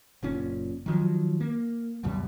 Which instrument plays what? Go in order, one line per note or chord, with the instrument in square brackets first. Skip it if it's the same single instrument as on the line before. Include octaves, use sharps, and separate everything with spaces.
[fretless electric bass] F#1 A#2 C#4
D#3 F3 F#3
A#3
C#2 F#2 B2 G3